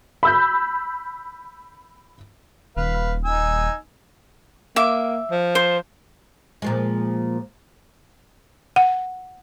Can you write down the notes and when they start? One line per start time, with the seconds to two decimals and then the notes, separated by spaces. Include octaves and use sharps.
0.23 B5 E6 G6
2.77 D#1 B4 F5
3.25 D#4 G#5 E6
4.76 A#3 E5 D6
5.31 F3
5.55 C5
6.62 A#2 F3 G#3
8.76 F#5